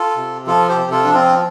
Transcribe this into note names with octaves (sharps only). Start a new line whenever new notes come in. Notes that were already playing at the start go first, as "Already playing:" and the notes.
Already playing: F4 A4
C3
F3 F4 A4
G4 C5
C3
F4 A4
F3 D4
C4 F4